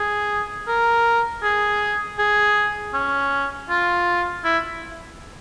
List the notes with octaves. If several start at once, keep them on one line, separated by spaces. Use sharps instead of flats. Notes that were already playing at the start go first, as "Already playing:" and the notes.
Already playing: G#4
A#4
G#4
G#4
C#4
F4
E4